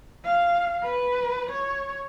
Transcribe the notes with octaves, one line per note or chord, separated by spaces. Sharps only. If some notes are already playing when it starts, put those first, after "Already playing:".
F5
B4
C#5